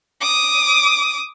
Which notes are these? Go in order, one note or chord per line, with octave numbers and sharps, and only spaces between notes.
D6 D#6